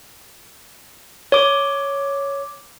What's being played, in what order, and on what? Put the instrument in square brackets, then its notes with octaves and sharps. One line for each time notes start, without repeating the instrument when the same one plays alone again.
[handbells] C#5 D6